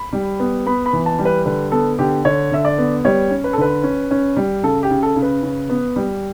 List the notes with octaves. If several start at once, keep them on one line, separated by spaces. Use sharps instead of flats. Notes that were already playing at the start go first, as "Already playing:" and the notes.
Already playing: B5
G3
B3
B3 B5
B5
E3
A5
G3
B4
D3 B4
B3 A4
D3 G4
D3 C#5
D3 E5
D5
B3
G3 C#5
C#4
B4
A4
D3 B4
C#4
C#4
G3
C#3 A4
G4
C#3
A4
C#3
B4
C#3
B3
G3